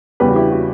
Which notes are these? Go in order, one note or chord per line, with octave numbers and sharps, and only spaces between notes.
E2 C#3 G3 G4 B4
F#4
E4 G4
F#4